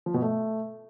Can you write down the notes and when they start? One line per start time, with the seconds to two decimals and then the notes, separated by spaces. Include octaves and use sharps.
0.06 F3
0.14 B2
0.22 A3